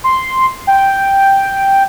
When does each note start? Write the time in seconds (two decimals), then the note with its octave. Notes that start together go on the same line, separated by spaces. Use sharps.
0.04 C6
0.67 G5